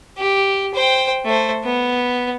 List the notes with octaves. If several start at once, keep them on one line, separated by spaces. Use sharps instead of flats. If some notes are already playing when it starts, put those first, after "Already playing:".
G4
C5 G5
A3 C5
B3